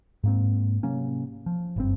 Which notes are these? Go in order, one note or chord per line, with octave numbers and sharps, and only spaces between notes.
G#2 A#3 C4
C3 F#3 A#3 C#4
F3
F#1 G2 C4